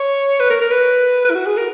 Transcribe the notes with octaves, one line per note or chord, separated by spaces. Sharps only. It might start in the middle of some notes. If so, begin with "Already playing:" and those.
Already playing: C#5
B4
A#4
A#4
B4
B4
E4
F#4
G#4
A#4